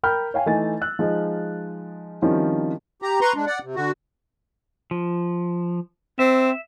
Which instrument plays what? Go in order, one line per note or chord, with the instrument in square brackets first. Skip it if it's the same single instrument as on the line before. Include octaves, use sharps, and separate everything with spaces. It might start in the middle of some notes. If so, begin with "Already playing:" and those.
[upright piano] A#4 G5 B5 F6 G6
C#5 F5 G5 G#5
E3 A3 D#4 G#5 A6
E6 F#6
F3 G#3 D#4
D#3 F3 G3 C4 C#4 E4
[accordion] G4 A#5
B4 A#5 C6 C#6
G#3 D4
D5 F#5
C3
D3 F#4
[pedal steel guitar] F3
[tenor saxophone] C4 [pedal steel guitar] E5